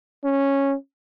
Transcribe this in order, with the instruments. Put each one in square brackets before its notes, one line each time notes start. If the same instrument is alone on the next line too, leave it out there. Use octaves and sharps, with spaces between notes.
[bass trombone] C#4